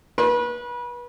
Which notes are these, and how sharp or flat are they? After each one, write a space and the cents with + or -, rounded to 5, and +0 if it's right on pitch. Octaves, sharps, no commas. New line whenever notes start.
B4 -30 C6 +35